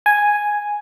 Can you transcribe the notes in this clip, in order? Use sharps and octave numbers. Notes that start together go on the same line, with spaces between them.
G#5